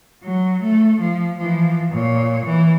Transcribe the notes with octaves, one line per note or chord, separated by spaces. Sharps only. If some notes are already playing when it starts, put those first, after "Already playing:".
F#3
A3
F3
E3 F3
A#2 C#5
E3